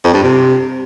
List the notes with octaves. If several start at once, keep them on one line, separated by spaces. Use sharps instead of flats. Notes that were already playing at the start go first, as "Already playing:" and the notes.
F2
G2
C3